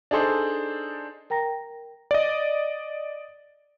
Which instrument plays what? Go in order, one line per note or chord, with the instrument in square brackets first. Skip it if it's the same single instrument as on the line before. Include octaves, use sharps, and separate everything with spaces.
[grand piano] D4 D#4 G#4 A4 C5 D5
[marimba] A#4 G5 A#5 A#6
[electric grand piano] D5 D#5